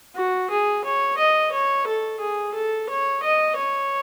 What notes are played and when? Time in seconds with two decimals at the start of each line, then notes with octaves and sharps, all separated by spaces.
0.16 F#4
0.50 G#4
0.85 C#5
1.18 D#5
1.52 C#5
1.87 A4
2.20 G#4
2.54 A4
2.89 C#5
3.23 D#5
3.57 C#5